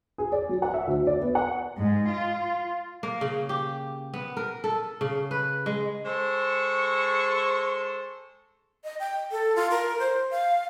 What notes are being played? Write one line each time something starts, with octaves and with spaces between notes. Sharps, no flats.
G#4
D5
F#3
F#5
E5
D2
D5
B3
F#5
G#2
F4
A#3
C#3
G4
B3
A#4
A4
C#3
B4
G#3
G#3 A4 C5 C#6
D#5
G5
A4
F4
A#4
C5
F5